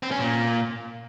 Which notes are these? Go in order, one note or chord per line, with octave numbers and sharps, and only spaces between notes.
C4
C#4
A#2